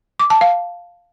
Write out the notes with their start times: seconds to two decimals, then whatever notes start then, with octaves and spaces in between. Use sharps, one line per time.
0.20 D6
0.30 A5
0.41 F5